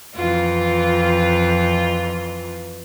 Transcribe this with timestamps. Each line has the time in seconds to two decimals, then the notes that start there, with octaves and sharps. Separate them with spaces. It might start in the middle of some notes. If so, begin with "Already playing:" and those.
0.15 F2 E3 F4